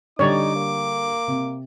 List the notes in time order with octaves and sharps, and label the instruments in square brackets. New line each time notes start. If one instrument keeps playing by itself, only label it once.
[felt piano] D3 G3 [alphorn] D#4 [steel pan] C#5 D5 [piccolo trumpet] D6
[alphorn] A#3
[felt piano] C3